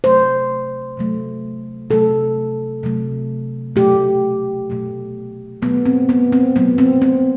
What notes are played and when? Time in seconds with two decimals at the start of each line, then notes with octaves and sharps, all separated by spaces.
0.04 C3 F#3 A3 C5
0.97 C3 F#3 A3
1.90 C3 F#3 A3 A4
2.83 C3 F#3 A3
3.76 B2 F#3 A3 G4
4.70 B2 F#3 A3
5.62 B2 B3
5.65 F#3 A3
5.85 C4
6.09 B3
6.32 C4
6.56 B2 F#3 A3 B3
6.78 C4
7.02 C4